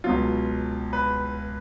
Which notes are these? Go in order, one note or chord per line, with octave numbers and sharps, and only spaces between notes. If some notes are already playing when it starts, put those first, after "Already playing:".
C#2 B2 F#3 F4
B4